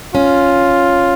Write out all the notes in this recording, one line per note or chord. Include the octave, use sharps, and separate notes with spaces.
C#4 F4